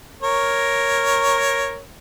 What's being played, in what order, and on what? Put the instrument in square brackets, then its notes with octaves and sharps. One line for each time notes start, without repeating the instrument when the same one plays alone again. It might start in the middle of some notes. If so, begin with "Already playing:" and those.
[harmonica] A#4 C#5